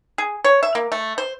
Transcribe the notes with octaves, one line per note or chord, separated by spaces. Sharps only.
G#4
C#5
E5
A#3
A3
C5